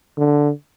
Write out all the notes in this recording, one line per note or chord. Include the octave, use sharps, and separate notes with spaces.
D3